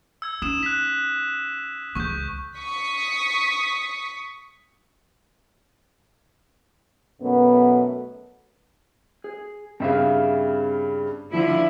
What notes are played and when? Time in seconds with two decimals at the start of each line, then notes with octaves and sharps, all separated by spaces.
0.22 E6 G#6
0.42 C#4 D#4 D#6 E7
0.63 F#6 B6
1.95 C#2 E3 C#6 G6
2.57 C#6 D#6 B6
7.22 F#2 B2 A3 B3
9.24 G#4
9.80 G2 C#3 C4 E5 F5
11.32 D3 F3 E4